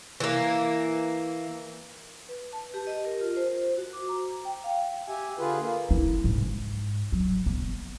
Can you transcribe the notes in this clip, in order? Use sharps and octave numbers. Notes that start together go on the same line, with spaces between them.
E3 A#3
B4
A5
G4
D#5
A#4
F4
C5
F#4
D6
A#5
G5
F5
G4 E5 G#5
D3 F4 G#4 B4
A#3
E4
G#2
F#3
B3